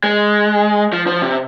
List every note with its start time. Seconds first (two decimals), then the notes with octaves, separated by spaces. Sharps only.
0.03 G#3
0.93 F3
1.07 F3
1.22 C3